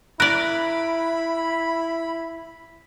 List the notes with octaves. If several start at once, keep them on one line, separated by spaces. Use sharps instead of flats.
E4 A#4 D5 B5 F#6